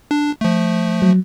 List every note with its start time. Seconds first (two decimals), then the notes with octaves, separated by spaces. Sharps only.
0.11 D4
0.41 F3 A3
1.02 F#3